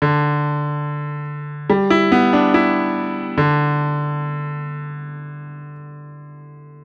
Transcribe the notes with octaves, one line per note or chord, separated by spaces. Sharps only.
D3
G3
E4
B3
D4
E4
D3